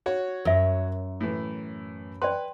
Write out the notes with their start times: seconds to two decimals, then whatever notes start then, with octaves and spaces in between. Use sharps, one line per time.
0.06 F#4 C#5
0.45 F#2 A#4 E5
1.21 A2 E3
2.22 B4 D5 G5 C6